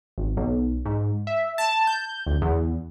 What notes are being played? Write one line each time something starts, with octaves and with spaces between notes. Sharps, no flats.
G#1
B1
G#2
E5
A5
G6
D2
E2